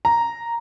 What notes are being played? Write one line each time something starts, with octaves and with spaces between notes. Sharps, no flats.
A#5